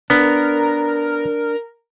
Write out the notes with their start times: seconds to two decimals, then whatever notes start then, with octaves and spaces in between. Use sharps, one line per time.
0.10 B3 D4 A#4